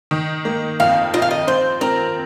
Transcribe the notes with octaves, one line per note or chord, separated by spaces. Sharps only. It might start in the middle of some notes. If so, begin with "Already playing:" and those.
D#3
A#3
F2 F5
F4 D#5
F5
D#5
C4 C5
C4 A#4